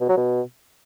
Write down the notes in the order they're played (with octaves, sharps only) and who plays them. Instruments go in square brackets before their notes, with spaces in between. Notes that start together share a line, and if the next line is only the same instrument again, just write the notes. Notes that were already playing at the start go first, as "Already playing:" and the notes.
[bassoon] B2
F#3
B2